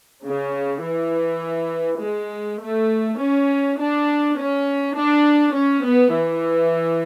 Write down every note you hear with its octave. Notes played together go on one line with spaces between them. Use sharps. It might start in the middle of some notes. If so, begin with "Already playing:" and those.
C#3
E3
G#3
A3
C#4
D4
C#4
D4
C#4
B3
E3